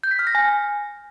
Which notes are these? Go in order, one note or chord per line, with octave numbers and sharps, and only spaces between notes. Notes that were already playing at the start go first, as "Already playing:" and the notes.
G6
B6
F6
A#6
G#5